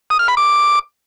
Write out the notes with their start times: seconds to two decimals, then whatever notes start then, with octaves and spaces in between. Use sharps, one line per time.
0.10 D#6
0.19 F6
0.28 B5
0.37 D6